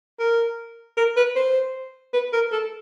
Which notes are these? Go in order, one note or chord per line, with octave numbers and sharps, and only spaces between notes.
A#4
A#4
B4
C5
B4
A#4
A4